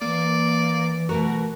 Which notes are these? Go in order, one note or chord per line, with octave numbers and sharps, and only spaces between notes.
E3 A#3 D5
B2 A3 F#4 A#4